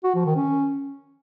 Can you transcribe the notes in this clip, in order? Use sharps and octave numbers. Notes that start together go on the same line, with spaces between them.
F#4
F3
D#3
C#4